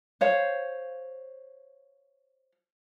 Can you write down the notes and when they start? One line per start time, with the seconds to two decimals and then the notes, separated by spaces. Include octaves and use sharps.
0.21 C5 C#5 F5